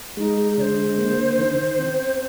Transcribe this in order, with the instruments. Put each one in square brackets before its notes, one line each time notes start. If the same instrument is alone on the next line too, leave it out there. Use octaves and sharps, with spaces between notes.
[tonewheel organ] G#3 [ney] D#4
[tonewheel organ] D3 [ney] C5 D5
[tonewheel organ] A#3
D#3
C4